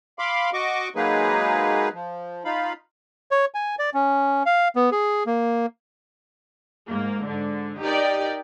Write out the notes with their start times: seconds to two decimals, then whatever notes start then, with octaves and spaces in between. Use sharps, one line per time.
0.19 F5 B5 C6 D6
0.53 F#4 D#5 C#6 D6
0.96 F#3 G#3 A#3 D#4 G#4 B4
1.93 F3
2.45 D#4 F4 F5 B5
3.31 C#5
3.54 G#5
3.79 D5
3.94 C#4
4.46 F5
4.76 B3
4.92 G#4
5.26 A#3
6.89 G#2 A#3
7.26 G#2 D3
7.81 D#4 G4 A#4 D5 G5